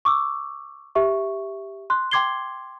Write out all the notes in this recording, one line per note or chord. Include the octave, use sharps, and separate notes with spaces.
C#6 D6 E6
G4 E5 C#6
C6 F#6
G5 C6 D6 G#6 C7 G7